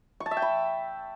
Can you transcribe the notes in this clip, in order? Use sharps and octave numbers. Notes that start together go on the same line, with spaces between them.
C#6
A5
E5
G5
B5